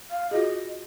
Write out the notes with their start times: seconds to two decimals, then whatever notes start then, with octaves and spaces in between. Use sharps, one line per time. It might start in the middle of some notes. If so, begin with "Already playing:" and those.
0.11 F5
0.31 F4 F#4 G#4 D#5